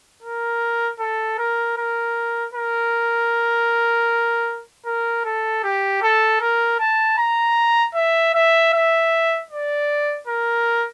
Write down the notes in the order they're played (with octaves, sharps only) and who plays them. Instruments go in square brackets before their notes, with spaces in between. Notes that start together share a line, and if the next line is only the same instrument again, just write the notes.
[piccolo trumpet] A#4
A4
A#4
A#4
A#4
A#4
A4
G4
A4
A#4
A5
A#5
E5
E5
E5
D5
A#4